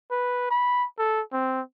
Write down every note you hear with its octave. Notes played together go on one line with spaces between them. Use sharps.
B4
B5
A4
C4